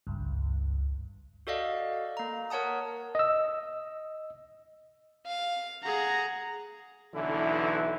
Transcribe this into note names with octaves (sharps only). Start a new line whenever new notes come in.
G#1 C#2 G2
F#4 A4 D5 D#5 F5
A#3 A#5
A#4 C#5 F#5 A5 D#6
D#5 E6
F5
G#4 F#5 A#5
B1 D3 E3 E4